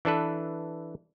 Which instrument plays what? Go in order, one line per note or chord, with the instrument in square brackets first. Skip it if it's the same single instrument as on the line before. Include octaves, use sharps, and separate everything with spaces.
[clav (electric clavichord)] E3 D4 A4 B4